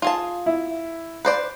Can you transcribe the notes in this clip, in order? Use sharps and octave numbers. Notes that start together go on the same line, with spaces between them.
F4 G#4 A5
E4
B4 C5 D5